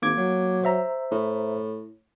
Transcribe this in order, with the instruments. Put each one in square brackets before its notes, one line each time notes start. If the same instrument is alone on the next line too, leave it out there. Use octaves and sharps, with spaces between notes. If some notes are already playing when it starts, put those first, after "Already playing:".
[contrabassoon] G#1 [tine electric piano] A#3 D6 G#6
[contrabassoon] F#3
[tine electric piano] C5 E5 A#5
[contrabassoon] A2